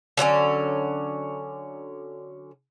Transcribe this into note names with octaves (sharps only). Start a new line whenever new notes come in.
D3 F#3 A3 C#4